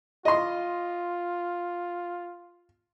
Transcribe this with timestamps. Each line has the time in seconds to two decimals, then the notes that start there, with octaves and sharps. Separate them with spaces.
0.25 F4 D#5 C6